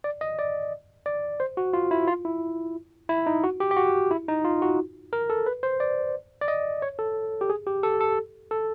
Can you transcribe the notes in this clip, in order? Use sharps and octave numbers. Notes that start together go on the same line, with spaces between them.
D5
D#5
D5
D5
C5
F#4
F4
E4
F4
E4
E4
D#4
F#4
G4
G4
F#4
E4
D#4
F4
F#4
A#4
A4
B4
C5
D5
D5
D#5
C#5
A4
G4
G#4
G4
A4
A4
A4